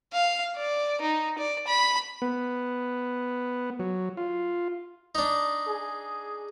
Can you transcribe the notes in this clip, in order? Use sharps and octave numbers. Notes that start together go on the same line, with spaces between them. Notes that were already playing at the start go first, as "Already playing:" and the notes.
F5
D5
D#4
D5
B5
B3
F#3
F4
D4 D#4
G#4